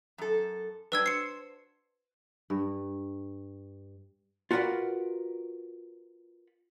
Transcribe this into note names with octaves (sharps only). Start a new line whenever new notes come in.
F#2 A4
F#3 G3 D4 B4 E6 G#6
C5 C7 C#7
G2
F4 F#4 A#4 B4 D5 F#5